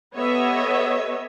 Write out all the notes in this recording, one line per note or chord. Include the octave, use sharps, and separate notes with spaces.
B3 G4 A4 C#5 D#5 E5